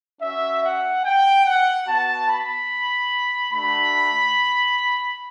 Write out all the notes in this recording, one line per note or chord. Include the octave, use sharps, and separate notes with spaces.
C#4 F#4 E5
F#5
G5
F#5
B3 F#4 A5
B5
A3 D4 F#4 B5